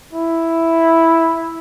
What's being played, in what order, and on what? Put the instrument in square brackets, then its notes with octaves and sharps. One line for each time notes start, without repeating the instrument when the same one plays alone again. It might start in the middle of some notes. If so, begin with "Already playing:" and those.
[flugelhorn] E4